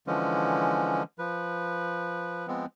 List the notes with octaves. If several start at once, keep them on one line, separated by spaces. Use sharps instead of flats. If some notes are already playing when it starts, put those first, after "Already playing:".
D3 E3 F3 G#3 C#4
F3 B4
F3 G#3 B3 C4